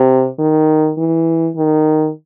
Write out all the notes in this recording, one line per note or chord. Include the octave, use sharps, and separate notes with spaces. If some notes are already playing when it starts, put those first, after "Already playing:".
Already playing: C3
D#3
E3
D#3